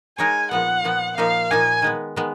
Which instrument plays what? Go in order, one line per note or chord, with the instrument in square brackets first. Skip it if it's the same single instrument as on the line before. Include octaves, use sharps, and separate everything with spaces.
[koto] G#3 D#4 A#4 C#5 [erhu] G#5
[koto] A#2 F3 B3 [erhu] F#5
[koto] A#2 F3 B3
[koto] A#2 F3 A#3 D#4 [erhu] F5
[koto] A#2 F3 A#3 D#4 [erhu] G#5
[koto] D#3 G#3 B3
D#3 G#3 B3